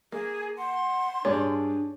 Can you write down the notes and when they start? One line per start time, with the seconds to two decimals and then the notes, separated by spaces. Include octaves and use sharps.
0.12 A#3 G#4
0.58 F#5 C6
1.25 G2 D4 G#4 C#5 D5